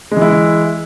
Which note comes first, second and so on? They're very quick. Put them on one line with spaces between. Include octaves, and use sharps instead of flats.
G#3 E3 E4